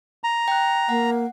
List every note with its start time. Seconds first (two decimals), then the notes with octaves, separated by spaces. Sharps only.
0.24 A#5
0.48 G5 F#6
0.89 A#3 F#5